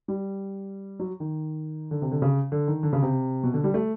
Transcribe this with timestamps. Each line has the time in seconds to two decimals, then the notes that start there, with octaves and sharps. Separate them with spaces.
0.08 G3
0.99 F#3
1.20 D#3
1.91 D3
2.02 C3
2.11 D3
2.22 C#3
2.52 D3
2.68 D#3
2.83 D3
2.93 C#3
3.02 C3
3.43 B2
3.54 D3
3.64 G3
3.74 A3